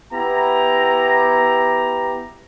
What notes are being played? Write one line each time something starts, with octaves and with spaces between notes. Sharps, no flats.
B3 E4 G4 A#5